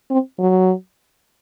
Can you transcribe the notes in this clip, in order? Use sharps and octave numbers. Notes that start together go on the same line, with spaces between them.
C4
F#3